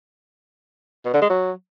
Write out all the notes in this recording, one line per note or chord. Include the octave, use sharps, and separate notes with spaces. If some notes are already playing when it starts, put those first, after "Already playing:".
B2
D3
G#3
F#3